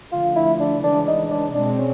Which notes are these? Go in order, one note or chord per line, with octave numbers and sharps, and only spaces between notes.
D3 F3 A3 F4
E4
D4
C#3 E3 G#3 D4
D#4
D4
B2 G#3 C4 D4
C#4